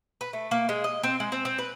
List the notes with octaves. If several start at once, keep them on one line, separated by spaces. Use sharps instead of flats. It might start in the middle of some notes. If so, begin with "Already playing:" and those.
B4
A3
A#3
G#3
D#5
C4
G#3
C4
C4
B4